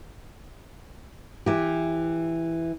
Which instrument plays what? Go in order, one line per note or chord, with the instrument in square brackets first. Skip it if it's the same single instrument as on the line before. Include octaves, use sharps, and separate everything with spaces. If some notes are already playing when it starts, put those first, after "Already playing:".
[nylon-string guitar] E3 G4